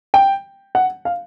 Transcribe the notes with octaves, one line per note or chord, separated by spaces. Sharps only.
G5
F#5
F5